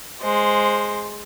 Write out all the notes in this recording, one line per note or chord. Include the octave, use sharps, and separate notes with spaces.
G#3 C5